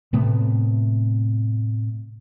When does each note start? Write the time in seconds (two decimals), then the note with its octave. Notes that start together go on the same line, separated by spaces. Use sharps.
0.13 A2 C3 A3 B3